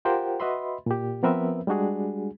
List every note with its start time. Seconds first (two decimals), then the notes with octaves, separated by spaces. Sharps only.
0.05 F4 G4 A#4 C5 F#5 G5
0.40 F#4 B4 D#5 E5 B5 C6
0.86 A#2 G4
1.23 F3 B3 C4 A#4 B4 E5
1.67 G3 G#3 D4 F#4 G#4